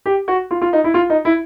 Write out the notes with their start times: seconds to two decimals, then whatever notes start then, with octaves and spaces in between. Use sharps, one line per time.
0.06 G4
0.28 F#4
0.51 F4
0.62 F4
0.73 D#4
0.84 E4
0.94 F4
1.10 D#4
1.25 E4